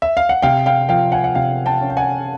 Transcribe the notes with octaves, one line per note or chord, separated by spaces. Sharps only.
E5
F5
F#5
C3 F5 G5
F5 G5
F3 F5 G5
F#5 G#5
F#5
C3 F5 G5
G5 A5
C#4
G5
F#5 G#5